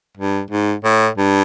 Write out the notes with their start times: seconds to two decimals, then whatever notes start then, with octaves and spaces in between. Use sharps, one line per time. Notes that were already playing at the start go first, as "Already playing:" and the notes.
0.17 G2
0.51 G#2
0.84 A2
1.18 G2